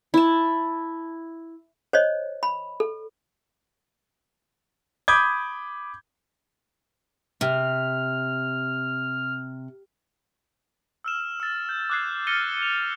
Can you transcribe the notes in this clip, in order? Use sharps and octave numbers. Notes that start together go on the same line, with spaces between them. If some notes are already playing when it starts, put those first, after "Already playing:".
E4 A5
C5 C#5 D#5
B5
A4
B5 D6 D#6 G6 G#6
C3 F6
E6 F6 E7
E6 A6
G6
D6 D#6 F#6 G#6 C7
F6 A6 A#6 C#7 D#7 G7
E7 F7